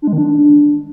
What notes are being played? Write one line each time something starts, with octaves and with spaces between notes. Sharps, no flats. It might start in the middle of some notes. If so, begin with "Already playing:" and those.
D4
G#3
D#3
D4